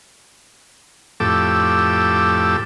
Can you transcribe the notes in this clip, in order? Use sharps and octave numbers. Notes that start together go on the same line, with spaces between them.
F2 A2 G4 A4 D6 E6